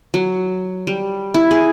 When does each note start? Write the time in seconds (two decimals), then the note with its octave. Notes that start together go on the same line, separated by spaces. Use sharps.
0.14 F#3
0.87 G3
1.34 E4
1.51 G#4